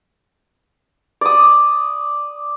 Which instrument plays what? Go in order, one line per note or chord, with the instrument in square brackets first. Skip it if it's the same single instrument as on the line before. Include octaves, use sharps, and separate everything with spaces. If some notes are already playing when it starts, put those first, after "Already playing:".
[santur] D5 D#6